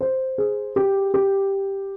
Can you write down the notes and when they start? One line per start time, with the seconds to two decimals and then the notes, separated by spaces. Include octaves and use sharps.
0.01 C5
0.38 G#4
0.76 G4
1.14 G4